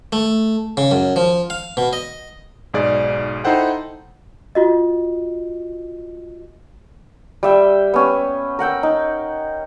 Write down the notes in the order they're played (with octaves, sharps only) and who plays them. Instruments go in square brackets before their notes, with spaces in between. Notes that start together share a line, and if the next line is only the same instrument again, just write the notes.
[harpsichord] A3
C#3
F#2
F3
F5
B2
D#5
[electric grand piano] B1 G#2 G#4 D5
D#4 E4 A4 C5 F#5 G5
[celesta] F4 F#4 D#5
[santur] G3 E5 G5
B3 C#4
A#4 F#5 G5 E6
D#4